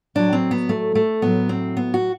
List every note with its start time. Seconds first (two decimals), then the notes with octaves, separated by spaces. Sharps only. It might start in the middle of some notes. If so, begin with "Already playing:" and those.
0.15 A2 F#3 D4
0.33 C4
0.51 B3
0.69 A3
0.95 A3
1.22 A2 F#3 B3
1.49 C4
1.77 B3
1.94 F#4